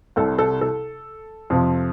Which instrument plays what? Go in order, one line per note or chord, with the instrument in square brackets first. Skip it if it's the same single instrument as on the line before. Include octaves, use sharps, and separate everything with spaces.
[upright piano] C2 C3 G3 A4
A4
A4
F2 C3 F3